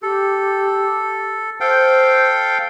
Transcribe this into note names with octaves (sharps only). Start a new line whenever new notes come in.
G4 A4
A4 C5 F5 G5